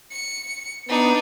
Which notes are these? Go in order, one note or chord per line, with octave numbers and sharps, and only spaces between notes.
C#7
B3 D4 D#4